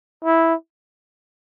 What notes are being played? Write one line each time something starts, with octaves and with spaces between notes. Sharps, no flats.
E4